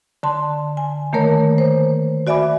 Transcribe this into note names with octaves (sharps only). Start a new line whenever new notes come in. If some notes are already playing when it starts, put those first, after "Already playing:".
D3 A5 C6
G#5
D#3 A3 A#3 A#4 C#5
C5
F#4 D5 E5 G#5 B5 D6